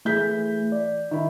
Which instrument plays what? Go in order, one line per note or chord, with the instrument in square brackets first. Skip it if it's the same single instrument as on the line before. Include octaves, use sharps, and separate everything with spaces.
[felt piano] E3 G6 B6 [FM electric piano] A3 G#4
[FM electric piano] D5
[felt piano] D#3 E4